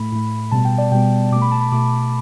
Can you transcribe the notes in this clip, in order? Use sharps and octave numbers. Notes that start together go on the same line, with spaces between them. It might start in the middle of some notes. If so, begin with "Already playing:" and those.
Already playing: A2 A3 B5
A2 A3
B2 G3 B3 A5
G5
D5
B2 G3 B3 G5
B2 A3 D6
B5
A5
B5
B2 A3 D6